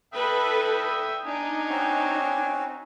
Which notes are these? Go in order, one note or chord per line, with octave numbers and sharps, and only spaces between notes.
A4 B4 E5 G5 D#6
D4 D#4 G#5
C4 C#4 F#4